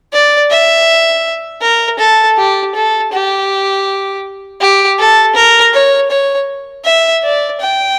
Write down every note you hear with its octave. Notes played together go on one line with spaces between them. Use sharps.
D5
E5
A#4
A4
G4
A4
G4
G4
A4
A#4
C#5
C#5
E5
D5
G5